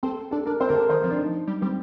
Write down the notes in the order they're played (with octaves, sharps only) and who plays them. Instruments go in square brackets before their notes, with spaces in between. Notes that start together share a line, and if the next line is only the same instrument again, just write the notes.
[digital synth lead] C4 [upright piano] A4
[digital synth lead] D4 [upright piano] A4
[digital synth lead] D4 [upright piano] A#4
[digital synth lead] C4 [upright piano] C5
[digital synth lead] D3 [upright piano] A#4
[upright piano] A4
[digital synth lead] D3
[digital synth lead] D#3 [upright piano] C5
[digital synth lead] F3 [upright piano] C4
[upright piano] D4
D#4
[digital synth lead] G3
[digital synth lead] G3 [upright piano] C4